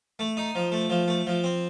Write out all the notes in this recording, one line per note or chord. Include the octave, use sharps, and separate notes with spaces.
A3
D#4
F3
A3
F3
A3
F3
C4